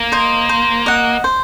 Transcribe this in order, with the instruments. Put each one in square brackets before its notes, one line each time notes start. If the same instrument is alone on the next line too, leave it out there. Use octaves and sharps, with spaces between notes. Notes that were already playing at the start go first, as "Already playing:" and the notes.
Already playing: [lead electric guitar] A#3
[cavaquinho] C5 D#5
C5
D#5 F#5
C5